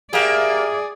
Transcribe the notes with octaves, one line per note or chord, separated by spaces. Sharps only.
A#3 F4 G4 G#4 D5 E5